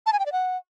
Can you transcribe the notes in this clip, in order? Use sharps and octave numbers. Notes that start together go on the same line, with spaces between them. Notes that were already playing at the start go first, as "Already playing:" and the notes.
A5
G#5
G5
D5
F#5